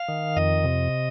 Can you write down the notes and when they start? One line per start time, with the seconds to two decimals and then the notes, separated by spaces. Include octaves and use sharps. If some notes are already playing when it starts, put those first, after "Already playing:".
Already playing: F5
0.08 D#3
0.36 F2 D#5
0.64 C3